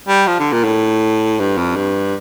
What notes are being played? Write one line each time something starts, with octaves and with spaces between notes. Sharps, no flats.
G3
F3
D3
A#2
A2
G2
F2
G2